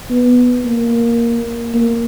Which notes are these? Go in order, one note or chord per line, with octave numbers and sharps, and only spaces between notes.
B3
A#3
A#3